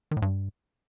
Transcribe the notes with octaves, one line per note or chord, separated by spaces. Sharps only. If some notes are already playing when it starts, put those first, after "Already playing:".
D#3
A2
G2